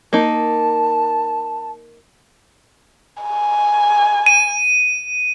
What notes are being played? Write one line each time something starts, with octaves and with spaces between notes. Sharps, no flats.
A#3 D#4 A5
G#5
D#7